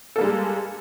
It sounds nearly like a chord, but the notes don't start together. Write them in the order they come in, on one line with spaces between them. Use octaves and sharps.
A4 A#3 G3 G#3